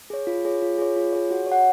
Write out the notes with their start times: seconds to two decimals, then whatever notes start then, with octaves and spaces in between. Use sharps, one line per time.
0.10 G#4 C#5
0.27 F4
0.45 G#4 C#5
0.62 F4
0.78 G#4 C#5
0.96 F4
1.13 G#4 C#5
1.31 F#4
1.47 C#5 F#5